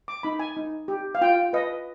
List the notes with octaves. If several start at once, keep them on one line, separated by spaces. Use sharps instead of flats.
D6
D#4 B5
G#5
D#4
G4
F5
F4 G5
B4 D#5